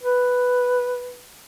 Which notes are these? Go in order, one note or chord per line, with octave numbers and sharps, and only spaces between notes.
B4